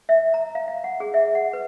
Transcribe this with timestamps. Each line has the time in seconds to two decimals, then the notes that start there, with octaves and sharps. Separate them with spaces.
0.09 E5
0.34 A#5
0.55 F5
0.68 F5
0.84 F#5
1.00 G#4
1.14 E5
1.35 F#5
1.53 B4